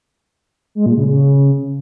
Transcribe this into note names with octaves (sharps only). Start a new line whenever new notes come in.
G#3
A#2
C#3
C#3